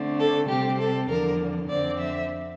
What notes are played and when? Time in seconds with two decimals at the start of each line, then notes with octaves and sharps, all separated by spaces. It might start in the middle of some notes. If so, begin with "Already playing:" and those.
Already playing: D3 A3 C4
0.19 A4
0.49 C3 G3 C4 G4
0.79 A4
1.09 E2 D3 F3 A#4
1.69 F2 D3 F3 C4 D5
1.99 E5